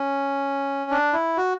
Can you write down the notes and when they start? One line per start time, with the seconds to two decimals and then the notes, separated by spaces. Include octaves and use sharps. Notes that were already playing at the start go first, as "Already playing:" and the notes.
Already playing: C#4
0.91 D4
1.13 E4
1.37 F#4